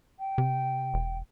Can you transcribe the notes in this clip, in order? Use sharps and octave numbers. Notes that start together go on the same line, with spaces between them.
G5
C3
E1